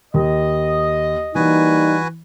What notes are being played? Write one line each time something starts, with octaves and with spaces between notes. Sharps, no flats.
D#2 D#5
E3 G3 A#3 D#4 F#4 B4 G#5